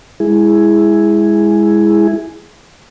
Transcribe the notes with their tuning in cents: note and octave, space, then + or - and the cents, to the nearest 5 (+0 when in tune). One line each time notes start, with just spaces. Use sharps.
G#3 -15 E4 +0 G#4 +0